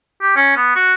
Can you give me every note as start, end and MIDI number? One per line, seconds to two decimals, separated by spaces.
0.22 0.32 67
0.36 0.53 61
0.57 0.72 59
0.76 0.94 66